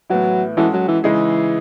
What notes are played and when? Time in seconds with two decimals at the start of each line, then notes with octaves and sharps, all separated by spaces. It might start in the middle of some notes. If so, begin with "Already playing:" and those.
0.10 A2 E3 F#3 B3 E4
0.57 E3 G#3 C#4 F#4 A4
0.73 F#3
0.88 E3
1.04 C#3 E3 G#3 D#4 G#4